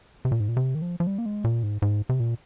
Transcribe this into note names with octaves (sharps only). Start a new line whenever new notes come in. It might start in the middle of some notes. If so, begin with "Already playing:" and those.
C3
A#2
G#2
A#2
C3
D#3
F3
F3
G3
A#3
G#3
A#2
G#2
G#2
C3
A#2